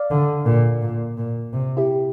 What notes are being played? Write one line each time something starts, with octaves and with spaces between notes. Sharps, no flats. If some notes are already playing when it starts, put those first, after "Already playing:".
Already playing: D5 F5
D3
A#2
A#2
A#2
C3
E4 G4